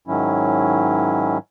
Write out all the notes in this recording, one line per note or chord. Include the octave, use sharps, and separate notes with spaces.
G#2 D#3 F#3 C#4 E4